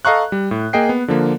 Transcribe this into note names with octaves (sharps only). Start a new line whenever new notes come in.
A4 D#5 F5 A#5 C#6 F#6
G3
A2
A#3 G#4 D#5 G5 C7
B3
D3 F3 A#3